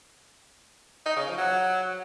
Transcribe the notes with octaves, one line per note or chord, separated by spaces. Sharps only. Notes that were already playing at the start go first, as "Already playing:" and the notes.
D#4
C#3
F3
F#3